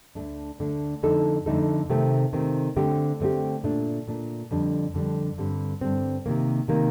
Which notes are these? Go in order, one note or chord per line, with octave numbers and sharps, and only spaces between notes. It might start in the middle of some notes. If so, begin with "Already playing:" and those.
D2 D3 A3 D4
D2 D3 A3 D4
F2 D3 A3 D#4 A4
F2 D3 A3 D#4 A4
C3 D#3 A3 C4
C3 D#3 A3 C4
D3 A3 C4 G4
D3 A3 C4 G4
A#2 A3 D4
A#2 A3 D4
F2 D3 G3 D4
F2 D3 G3 D4
G2 D3 G3 C4
G2 D3 G3 C4
C3 D#3 A#3
C3 D#3 A#3